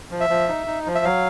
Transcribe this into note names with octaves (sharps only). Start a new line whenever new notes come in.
F3
E5
F3
D#4
D#4
F3
E5
F#3 F5